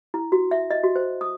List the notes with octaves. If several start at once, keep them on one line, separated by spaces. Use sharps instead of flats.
E4
F#4
E5
D#5
F#4
C5
D#6